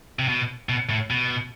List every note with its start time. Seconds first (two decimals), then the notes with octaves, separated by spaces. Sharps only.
0.19 C3
0.28 B2
0.69 B2
0.90 A2
1.10 B2